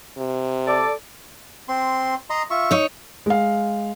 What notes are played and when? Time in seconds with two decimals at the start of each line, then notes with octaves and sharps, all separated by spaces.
0.18 C3
0.66 A4 D5
1.69 C4 C6
2.30 D#5 A#5 C6
2.50 F4 E5 C#6
2.71 D#4 C#5
3.26 G#3 F5